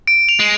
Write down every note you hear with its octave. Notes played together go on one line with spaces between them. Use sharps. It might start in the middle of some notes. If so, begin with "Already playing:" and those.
D7
F7
G#3